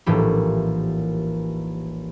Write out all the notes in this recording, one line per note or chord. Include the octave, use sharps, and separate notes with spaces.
D#1 A#1 A2 E3 G4